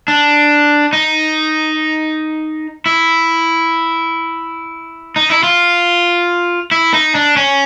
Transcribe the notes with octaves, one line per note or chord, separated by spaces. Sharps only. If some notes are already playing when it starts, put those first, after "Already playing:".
D4
D#4
E4
D#4
E4
F4
E4
D#4
D4
C#4